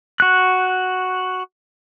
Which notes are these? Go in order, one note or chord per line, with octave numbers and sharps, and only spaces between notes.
F#4 F#6